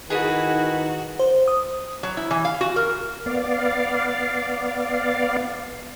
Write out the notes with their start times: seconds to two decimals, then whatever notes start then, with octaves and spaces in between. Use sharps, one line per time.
0.10 D#3 D#4 E4 F#4 G#4 B4
1.19 C5
1.48 D#6
2.03 F#3
2.17 E4
2.31 E3
2.45 F5
2.61 F#4
2.76 A#4
3.26 B3 D5 F5